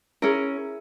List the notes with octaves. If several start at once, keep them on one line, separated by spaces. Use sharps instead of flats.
C#4 E4 G#4 A#4